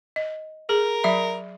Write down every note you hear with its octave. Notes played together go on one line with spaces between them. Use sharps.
D#5
G#4 A#4
F#3 E5 B5